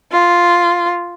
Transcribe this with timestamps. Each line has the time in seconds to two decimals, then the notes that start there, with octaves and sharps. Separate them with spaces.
0.11 F4